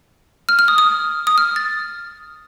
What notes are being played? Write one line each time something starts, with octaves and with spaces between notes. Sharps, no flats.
F6
F6
D#6
D#6
D#6
F6
A6